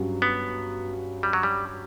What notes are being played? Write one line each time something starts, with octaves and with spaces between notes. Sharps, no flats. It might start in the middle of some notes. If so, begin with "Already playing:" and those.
Already playing: G2 F#3 C#4
B3
G3
F#3
G3